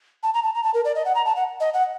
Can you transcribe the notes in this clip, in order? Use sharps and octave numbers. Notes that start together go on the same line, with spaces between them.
A5
A#5
A5
A#5
A5
A#4
D5
D#5
F#5
A#5
A5
F#5
D#5
F#5